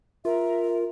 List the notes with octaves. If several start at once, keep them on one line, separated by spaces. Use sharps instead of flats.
F4 A#4 E5